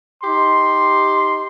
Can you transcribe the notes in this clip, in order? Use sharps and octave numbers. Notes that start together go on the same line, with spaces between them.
D#4 G4 C6